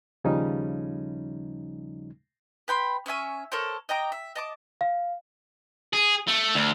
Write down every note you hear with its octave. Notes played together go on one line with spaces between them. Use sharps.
D#2 C#3 F3 G3 C#4 D#4
B4 G5 B5 C6
C#4 C#5 E5 G#5
A4 A#4 C5 C#5
D#5 G5 A#5 D6
E5
D#5 A5 D6
F5
G#4
A3
D2